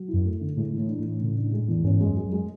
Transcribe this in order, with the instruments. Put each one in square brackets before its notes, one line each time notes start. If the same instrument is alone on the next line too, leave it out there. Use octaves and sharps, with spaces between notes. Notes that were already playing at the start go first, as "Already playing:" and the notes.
Already playing: [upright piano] F#3
E4
[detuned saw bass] F#2
[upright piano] A3
D3
[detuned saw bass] A2 [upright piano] G#3
[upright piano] E3
[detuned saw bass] A2
[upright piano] D4
[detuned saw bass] A2
[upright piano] E3
C#3
D4
G#3
E2
[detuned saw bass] G#2 [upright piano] C#4
[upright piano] G#3
[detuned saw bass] F#2
[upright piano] G#4
[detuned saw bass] F#2
[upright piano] G#3